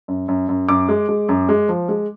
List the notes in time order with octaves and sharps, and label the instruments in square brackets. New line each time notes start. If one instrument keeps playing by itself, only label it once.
[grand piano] F#2
F#2
F#2
F#2 D6
G#3
G#3
F#2
G#3
F3
G#3